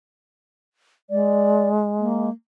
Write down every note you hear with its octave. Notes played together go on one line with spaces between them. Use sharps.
G#3 D5
A#3